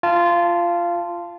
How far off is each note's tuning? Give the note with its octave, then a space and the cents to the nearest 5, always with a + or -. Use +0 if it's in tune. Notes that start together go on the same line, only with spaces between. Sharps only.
F4 -15 A5 +0